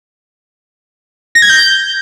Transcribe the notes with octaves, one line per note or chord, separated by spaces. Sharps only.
A#6
G#6
G6